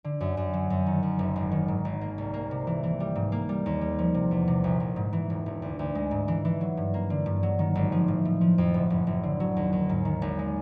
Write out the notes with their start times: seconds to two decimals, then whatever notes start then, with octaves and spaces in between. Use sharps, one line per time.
0.04 D3
0.20 F#2
0.37 F#2
0.53 F#3
0.70 F#2
0.86 D#3
1.03 F#2
1.19 F#1
1.36 G#1
1.52 D#3
1.68 G#2
1.85 G#1
2.01 A#3
2.18 C2
2.34 A#3
2.51 C3
2.67 E3
2.83 E3
3.00 G3
3.16 G#2
3.32 A#3
3.49 G3
3.66 D#2
3.81 G3
3.99 F3
4.15 C3
4.31 E2
4.48 C3
4.64 A#1
4.80 A#1
4.96 G#2
5.13 E3
5.30 E1
5.46 E1
5.62 D2
5.79 D2
5.95 G#3
6.11 G#2
6.28 E3
6.45 E3
6.61 F#3
6.77 G2
6.94 A#3
7.10 D3
7.26 G2
7.43 F#3
7.59 D#3
7.75 G#1
7.92 F3
8.08 A2
8.25 A2
8.41 F3
8.58 F2
8.74 F#1
8.90 F#1
9.07 F#1
9.23 D3
9.40 F#3
9.57 D#2
9.73 D#2
9.89 G#2
10.05 D#3
10.22 G#1
10.39 G#3